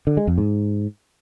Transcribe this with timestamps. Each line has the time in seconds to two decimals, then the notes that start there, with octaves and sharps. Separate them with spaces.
0.07 D3
0.17 G#3
0.27 F2
0.38 G#2